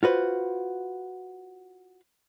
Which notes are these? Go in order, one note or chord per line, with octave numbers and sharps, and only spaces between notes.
F4 F#4 B4 C5